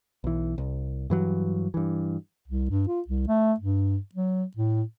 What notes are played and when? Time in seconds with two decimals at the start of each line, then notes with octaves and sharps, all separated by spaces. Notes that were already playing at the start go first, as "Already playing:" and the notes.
0.24 B1 E3
0.58 C2
1.10 G2 E3 F#3
1.74 G2 E3
2.48 C2
2.70 G2
2.88 F4
3.08 C2
3.28 A3
3.60 G2
4.15 F#3
4.57 A2